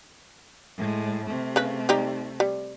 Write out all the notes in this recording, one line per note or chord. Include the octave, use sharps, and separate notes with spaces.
A2 G#3
C3 A3
C#3 B4
G3 D#4 G4
G3